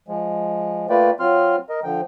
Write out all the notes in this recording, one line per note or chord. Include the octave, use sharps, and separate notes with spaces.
F3 G#3
A3 A#3 F4 B4 D5 G5
F#3 C4 F4 C6 F6
A#4 D#5
D3 F3 G5